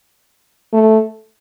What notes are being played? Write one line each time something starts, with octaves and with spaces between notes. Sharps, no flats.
A3